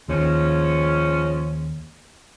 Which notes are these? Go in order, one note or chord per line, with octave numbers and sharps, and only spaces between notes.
D#2 F3 G#3 C#4